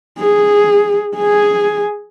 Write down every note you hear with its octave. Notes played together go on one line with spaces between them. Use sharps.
G#4
G#4 G#5